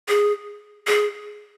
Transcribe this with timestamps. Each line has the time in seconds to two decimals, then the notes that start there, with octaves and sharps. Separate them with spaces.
0.08 G#4
0.87 G#4